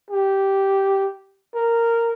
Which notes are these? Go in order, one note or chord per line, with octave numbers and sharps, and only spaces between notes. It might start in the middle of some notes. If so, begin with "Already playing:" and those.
G4
A#4